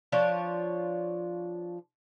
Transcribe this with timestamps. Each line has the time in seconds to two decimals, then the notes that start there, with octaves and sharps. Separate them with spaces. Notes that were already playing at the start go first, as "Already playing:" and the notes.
0.12 F3 D4 F4 C#5